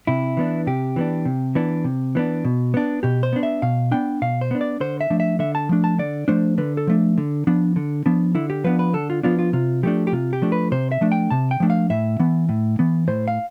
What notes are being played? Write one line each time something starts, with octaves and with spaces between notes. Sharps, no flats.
C3 E4
E3 B3 D4
C3 G4
E3 B3 D4
C3
E3 B3 D4
C3
E3 B3 D4
B2
B3 D4
B2 G4
C5
B3 D4
E5
B2 F5
B3 D4 G5
B2 F5
C5
B3 D4
D5
D3 C5
E5
F3 A3 D4
E5
D3 E5
A5
F3 A3 D4
A5
D3 D5
F3 A3 D4 C5
D3 B4
A4
F3 A3 D4
D3
F3 B3 D4
D3
F3 B3 D4
D3 E4
G4
F3 B3 D4 B4
B4
D3 A4
F4
F3 B3 D4 F4
F4
C3 F4
F3 A3 D4 G4
G4
C3 F4
G4
F3 A3 D4
B4
C3 C5
E5
F3 A3 D4
G5
C3 A5
G5
F3 A3 D4
F5
A2 E5
E3 B3
A2
E3 B3
A2 C5
F5